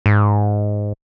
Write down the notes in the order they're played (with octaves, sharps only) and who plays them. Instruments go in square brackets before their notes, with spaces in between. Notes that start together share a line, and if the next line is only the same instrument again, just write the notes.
[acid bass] G#2